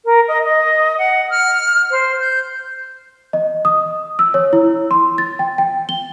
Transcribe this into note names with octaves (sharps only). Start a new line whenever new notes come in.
A#4
D#5
D#5
F#5
F6
C5
G6
D#5
D#6
E6
C#5
E4
C6
A6
G5
G5
G7